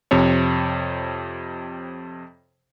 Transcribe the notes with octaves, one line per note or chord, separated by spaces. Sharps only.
F2 C3 C#5